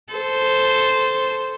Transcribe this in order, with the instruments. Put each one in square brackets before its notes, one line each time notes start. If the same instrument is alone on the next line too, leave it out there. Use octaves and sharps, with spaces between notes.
[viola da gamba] A4 C5